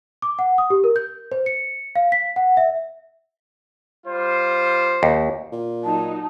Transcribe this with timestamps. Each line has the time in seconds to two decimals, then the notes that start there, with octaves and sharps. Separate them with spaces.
0.22 D6
0.39 F#5
0.58 D#6
0.70 G4
0.84 A#4
0.96 G6
1.32 C5
1.46 C#7
1.95 F5
2.12 B6
2.36 F#5
2.57 E5
4.06 G3 F4 C5
5.03 D#2
5.52 A#2
5.84 F#3 D#4 A5